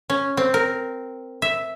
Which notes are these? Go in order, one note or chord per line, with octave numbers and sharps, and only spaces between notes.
C#4
C4
A#4
E5